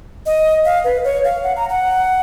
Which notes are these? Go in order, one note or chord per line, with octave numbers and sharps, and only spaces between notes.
D#5
F5
B4
C#5
F5
F#5
A#5
F#5